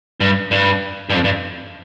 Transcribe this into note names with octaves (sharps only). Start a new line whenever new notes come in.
G2
G2
G2
F2
G2